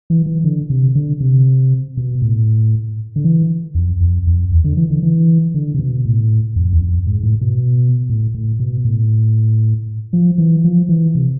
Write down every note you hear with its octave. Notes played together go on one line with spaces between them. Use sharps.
E3
E3
D3
C3
D3
C3
B2
A2
D3
E3
F2
F2
F2
E2
D3
E3
D3
E3
D3
C3
B2
A2
F2
E2
F2
G#2
A2
B2
A2
A2
B2
A2
F3
E3
F3
E3
C3